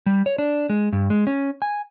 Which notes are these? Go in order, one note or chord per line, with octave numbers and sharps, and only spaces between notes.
G3
C#5
D4
G#3
G2
G#3
C#4
G#5